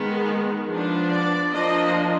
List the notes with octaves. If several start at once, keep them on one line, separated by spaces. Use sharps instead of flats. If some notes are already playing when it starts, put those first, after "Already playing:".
Already playing: D#3 G#3 B3
F3 B3 D4
D5
F3 A#3 D4 D#5